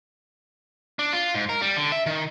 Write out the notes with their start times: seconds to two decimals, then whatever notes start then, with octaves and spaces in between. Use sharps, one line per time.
0.99 D4
1.13 F4
1.35 G#2
1.49 A#4
1.62 G3
1.77 D3
1.92 E5
2.06 D#3